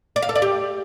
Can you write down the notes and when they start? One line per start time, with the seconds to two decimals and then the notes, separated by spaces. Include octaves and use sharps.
0.16 D5
0.22 F5
0.29 A4
0.35 D5
0.42 G4